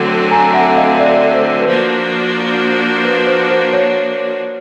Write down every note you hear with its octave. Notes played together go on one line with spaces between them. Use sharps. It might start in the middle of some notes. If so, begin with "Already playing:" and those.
Already playing: D3 F#3 A3 C4
G#5 A#5
E5 F#5
D#5 F5
D5 E5
C5
B4
F3 A#3 D4 F#4 C5
B4
C5
C5
C#5